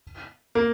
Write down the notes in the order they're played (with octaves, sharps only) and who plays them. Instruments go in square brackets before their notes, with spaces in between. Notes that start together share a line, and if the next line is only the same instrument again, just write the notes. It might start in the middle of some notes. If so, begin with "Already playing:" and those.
[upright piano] A#3